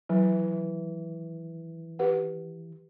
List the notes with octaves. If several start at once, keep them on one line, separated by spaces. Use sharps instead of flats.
E3 F#3
G4 B4 F#5